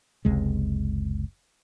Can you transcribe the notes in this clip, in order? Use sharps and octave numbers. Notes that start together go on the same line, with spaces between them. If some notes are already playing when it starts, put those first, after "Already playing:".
F#1 C#2 C3 G#3